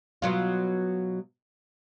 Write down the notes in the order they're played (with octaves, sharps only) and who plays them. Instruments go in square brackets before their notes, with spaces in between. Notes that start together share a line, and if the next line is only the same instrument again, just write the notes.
[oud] B2 F#3 F4